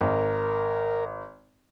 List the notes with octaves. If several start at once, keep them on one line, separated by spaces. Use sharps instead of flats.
G#1 A#4